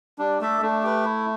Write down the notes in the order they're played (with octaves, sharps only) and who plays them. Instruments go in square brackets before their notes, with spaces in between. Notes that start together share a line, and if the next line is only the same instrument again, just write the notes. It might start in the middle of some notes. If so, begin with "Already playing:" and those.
[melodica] G3 [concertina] D4
[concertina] A3 [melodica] D4 A4 E5
[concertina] A3 [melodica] D4
[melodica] G4 B4
E4